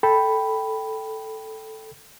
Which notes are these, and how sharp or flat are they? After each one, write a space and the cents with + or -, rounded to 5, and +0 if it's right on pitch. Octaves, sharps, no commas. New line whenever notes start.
A4 +0 G5 +0 B5 +0